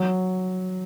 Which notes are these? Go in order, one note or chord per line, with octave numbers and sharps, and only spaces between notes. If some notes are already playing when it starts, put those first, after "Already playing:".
Already playing: F#3